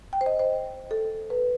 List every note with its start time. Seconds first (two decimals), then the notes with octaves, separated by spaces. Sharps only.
0.13 G5
0.21 C5
0.26 D#5
0.39 C5
0.91 A4
1.30 B4